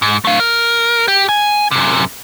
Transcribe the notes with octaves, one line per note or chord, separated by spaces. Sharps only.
G#2
A3 F5
A#4
G4
G#5
F#2 C3